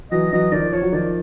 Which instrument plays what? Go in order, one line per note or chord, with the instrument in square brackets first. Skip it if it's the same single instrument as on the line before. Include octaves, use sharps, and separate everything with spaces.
[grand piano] E3 F#3 [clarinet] D#5
[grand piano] E3 F#3 [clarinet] D#5
[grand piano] D#3 F3 [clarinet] D5
[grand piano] F3 [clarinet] C#5
[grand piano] F#3
[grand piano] D#3 F3 [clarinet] D5